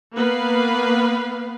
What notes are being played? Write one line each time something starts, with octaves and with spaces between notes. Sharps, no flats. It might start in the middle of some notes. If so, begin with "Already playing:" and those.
A#3 B3 B4 F5